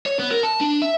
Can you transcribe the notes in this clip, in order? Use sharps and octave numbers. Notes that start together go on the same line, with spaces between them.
C#5
B3
A#4
A5
D4
E5